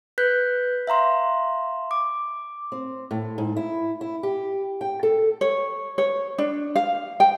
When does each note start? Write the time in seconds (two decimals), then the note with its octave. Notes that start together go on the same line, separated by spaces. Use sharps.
0.18 B4 F#6 G6 B6
0.87 E5 F5 A#5 C6
1.91 D6
2.72 C4
3.11 A2
3.38 G#2
3.57 E4
4.01 E4
4.23 G4
4.81 G5
5.03 A4
5.41 C#5
5.98 C#5
6.38 D4
6.76 F5
7.20 G5